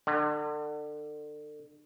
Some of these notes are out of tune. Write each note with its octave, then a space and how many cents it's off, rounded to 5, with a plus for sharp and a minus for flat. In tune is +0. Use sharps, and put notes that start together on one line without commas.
D3 +30